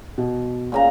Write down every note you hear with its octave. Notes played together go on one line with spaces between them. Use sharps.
B2
A#2 C#3 A#5